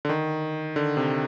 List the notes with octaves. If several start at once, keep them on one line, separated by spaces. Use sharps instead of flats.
D3
D#3
D3
C3